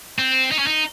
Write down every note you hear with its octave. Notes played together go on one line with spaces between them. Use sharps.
C4
D#4
C#4
D#4